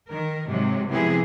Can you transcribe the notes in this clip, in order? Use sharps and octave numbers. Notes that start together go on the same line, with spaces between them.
D#3 A#4
G#2 C3 F#3 G#3
C3 F3 B3 E4 G#4